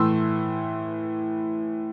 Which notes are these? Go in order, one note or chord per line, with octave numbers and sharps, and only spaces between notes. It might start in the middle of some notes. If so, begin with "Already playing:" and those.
Already playing: A2 E3 A3 C6 E6